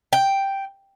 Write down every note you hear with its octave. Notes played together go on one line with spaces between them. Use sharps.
G5